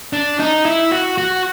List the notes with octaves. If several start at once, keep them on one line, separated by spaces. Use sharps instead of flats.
D4
D#4
E4
F#4
F#4